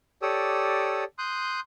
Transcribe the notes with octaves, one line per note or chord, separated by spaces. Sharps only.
G4 A4 C#5 D5 D#6 E6
C6 D#6 F#6 G6